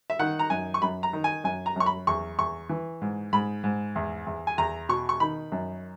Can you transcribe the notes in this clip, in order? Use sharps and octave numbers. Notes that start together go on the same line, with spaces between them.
E5
D#3 F#5
A#5
F#2 G#5
C#6
F#2 B5
A#5
D#3
G#5
F#2 G#5
A#5
F#2 C#6
B5
E2 C#6
E2 C#6
E3
G#2
G#2 B5
G#2
E2
E2
G#5
E2 A#5
B2 C#6
C#6
D#3 B5
F#2